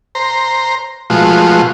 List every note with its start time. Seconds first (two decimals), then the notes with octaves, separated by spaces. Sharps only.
0.15 C5 A#5
1.10 B2 F3 G#3 A3 F4 F#4